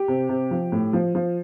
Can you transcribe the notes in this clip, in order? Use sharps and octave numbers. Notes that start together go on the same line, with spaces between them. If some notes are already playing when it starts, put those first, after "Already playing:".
Already playing: G4
C3
C3
F3
A2
F3
F3